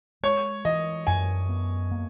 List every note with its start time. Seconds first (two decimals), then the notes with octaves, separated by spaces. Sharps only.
0.23 G#3 C#5
0.65 E3 D#5
1.07 F#2 G#5
1.49 B3
1.91 A#3